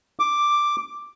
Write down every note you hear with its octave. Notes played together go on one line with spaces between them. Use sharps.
D6